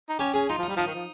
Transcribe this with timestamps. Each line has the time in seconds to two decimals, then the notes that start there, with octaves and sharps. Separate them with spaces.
0.09 D#4
0.19 C#4 G4
0.34 C#4 G#4
0.49 D#4 F4
0.58 F3
0.63 D#4
0.69 G3
0.77 F3 D#4
0.86 D#3
0.95 F3